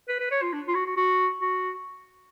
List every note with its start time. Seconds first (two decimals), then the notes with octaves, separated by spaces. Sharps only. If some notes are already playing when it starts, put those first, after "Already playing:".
0.09 B4
0.20 B4
0.31 C#5
0.42 F4
0.53 D4
0.67 F4
0.74 F#4
0.86 F#4
0.97 F#4
1.41 F#4